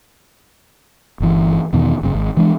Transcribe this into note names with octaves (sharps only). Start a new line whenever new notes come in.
G1 E3
E2 B2 D#3
F#1 F#2 C#3
G#1
E3 G#3 D4